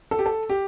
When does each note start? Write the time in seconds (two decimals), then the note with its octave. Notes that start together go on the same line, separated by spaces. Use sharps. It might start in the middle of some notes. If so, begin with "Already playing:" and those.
0.11 A4
0.19 G4
0.26 A4
0.49 G4